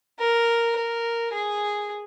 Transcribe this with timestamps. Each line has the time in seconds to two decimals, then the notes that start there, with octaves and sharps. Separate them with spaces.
0.19 A#4
0.76 A#4
1.32 G#4